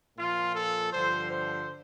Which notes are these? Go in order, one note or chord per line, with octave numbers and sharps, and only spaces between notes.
A#2 F3 F4
A4
G2 D3 F3 C5
C5